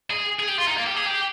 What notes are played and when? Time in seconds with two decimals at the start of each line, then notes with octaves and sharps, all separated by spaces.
0.10 G#4
0.39 G#4
0.48 G4
0.58 F4
0.67 D#4
0.77 A#3
0.86 G4
0.96 G#4
1.06 G4